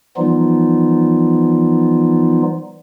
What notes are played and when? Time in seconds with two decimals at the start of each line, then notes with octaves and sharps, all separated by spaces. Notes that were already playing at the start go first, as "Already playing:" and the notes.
0.17 E3 F3 G3 B3 D#4 F4